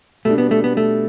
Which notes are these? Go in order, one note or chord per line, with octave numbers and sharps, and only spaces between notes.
B2 G3 A3 D4
B3
A3
B3
A3